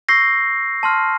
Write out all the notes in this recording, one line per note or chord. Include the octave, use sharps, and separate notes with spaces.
C#6 E6 G6 A#6 C7
A5 C6 F6